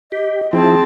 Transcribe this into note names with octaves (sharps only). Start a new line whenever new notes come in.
G4 D#5
F3 C4 E4 G#4 A5